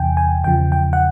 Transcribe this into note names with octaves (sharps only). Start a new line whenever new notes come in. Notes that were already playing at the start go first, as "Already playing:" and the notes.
Already playing: E2 C3 E3 G5 G#5
G#5
E2 C#3 F3 G5
G5
F#5